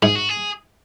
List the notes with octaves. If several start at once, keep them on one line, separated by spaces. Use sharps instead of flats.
G#2 G#4
F#4
G#4